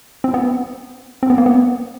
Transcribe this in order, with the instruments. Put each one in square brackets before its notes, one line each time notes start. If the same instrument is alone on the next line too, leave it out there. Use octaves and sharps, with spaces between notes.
[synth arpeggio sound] C4
B3
C4
B3
A#3
B3